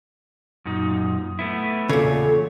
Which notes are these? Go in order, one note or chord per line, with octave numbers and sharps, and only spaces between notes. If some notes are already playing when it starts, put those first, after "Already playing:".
F#2 A#2 D#4
A3 B3 E4
E2 A#2 C#3 A4 C#5